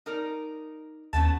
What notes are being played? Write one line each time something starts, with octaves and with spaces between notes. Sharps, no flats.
D#4 A#4 D5
D#2 A3 B3 C#4 A5